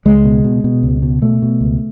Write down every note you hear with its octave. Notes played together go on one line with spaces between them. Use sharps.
C#2 G#3
B2
B2
B2
C#2
B2
B2 A3
B2
C#2